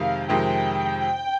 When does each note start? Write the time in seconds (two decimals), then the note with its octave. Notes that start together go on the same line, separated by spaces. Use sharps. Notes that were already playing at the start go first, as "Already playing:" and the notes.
Already playing: F2 C3 D#3 G#3 F5
0.29 F2 C3 D#3 G#3 C4 G5